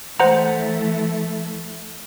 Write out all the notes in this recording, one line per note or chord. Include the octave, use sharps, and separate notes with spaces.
E3 A3 C5 F#5 A#5